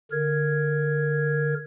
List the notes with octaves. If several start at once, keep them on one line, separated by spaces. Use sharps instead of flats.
D3 A#4 G#6